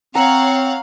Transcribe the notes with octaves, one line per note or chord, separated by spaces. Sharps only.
C4 C#5 F5 F#5 A#5